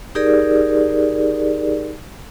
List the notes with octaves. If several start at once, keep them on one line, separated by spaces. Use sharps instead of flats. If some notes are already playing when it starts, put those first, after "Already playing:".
D#4 G4 G#4 A#4 D5